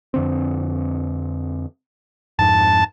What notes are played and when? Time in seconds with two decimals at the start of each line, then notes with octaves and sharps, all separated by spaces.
0.14 F2 D3 C4
2.39 F2 G#2 A5